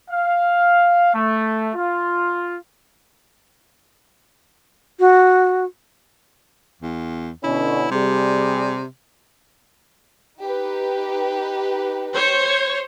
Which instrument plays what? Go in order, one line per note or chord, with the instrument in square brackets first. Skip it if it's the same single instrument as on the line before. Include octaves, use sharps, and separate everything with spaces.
[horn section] F5
A3
F4
[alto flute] F#4
[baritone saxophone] E2
[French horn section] B2 D3 C#4 [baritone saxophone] E4
[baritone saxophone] C3 [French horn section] G3 G#4
[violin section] D#4 G4 B4
[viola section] C5 C#5